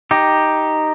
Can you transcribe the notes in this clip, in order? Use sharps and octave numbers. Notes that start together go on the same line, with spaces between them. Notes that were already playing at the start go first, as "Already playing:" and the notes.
D#4 G4